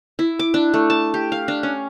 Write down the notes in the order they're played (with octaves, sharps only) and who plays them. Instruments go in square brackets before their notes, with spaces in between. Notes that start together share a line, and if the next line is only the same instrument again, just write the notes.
[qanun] E4
D6
D4
A3
A5
G4
F5
D4
C#4